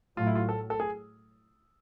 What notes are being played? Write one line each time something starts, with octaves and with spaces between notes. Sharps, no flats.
A2 F#3 A3 F4
E4
F4
A4
A4
G#4